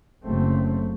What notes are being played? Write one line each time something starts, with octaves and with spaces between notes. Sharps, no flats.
F#1 A3 C4